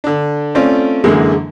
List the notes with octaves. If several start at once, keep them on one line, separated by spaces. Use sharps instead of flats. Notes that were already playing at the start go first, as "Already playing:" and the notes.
D3 D4
A3 C4 C#4 F4 D5
F#2 D3 E3 G#3 A#3